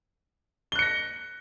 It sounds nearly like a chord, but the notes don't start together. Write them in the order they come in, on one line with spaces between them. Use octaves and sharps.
G7 F#6 C#7 A#6